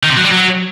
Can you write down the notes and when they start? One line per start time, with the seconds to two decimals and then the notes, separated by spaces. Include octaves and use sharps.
0.03 D#3
0.10 C3
0.17 F#3
0.23 G3
0.30 F#3